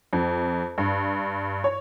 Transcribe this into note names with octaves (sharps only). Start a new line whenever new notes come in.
F2
G2
C#5